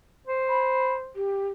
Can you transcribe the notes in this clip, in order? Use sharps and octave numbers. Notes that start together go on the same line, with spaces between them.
C5
B5
G4